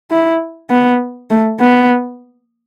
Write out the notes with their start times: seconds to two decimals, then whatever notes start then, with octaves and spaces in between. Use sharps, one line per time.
0.11 E4
0.70 B3
1.31 A3
1.60 B3